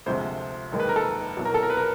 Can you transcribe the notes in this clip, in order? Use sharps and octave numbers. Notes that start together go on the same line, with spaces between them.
D2 C3 F3 G#3 C5
F1 D#2 D#3 G#3
B4
A#4
A4
C2 B2 F#3
A#4
A4
A#4
B4
A#4